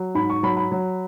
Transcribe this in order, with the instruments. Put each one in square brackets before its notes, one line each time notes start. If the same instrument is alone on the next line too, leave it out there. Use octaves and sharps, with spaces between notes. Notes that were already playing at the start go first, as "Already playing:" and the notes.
Already playing: [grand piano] F#3
G#2 B5
C#6
F#3 B5
B5
F#3